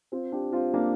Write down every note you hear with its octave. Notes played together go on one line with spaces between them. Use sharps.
C4 F4
D4 G4
C4 F4
A#3 D4